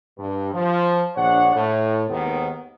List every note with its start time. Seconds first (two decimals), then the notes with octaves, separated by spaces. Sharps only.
0.17 G2
0.53 F3
1.15 A#1 D4 C#5 F#5
1.55 A2
2.10 D#2 G#2 C3 D#3 B3